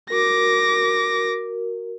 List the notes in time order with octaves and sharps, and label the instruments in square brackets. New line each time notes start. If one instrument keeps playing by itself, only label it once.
[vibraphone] F#4 A#4 [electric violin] D6 A#6